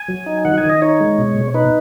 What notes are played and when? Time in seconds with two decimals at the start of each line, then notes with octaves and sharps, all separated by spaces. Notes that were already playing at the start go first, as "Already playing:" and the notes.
Already playing: G#5
0.08 F#3
0.26 D#4
0.45 D#3 F#5
0.58 G#5
0.63 D#3
0.70 D#5
0.82 D#4 C#5
1.00 G#3
1.18 B2
1.37 B2
1.54 D#4 B4